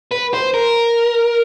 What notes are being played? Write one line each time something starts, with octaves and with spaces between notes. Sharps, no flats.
B4
C5
A#4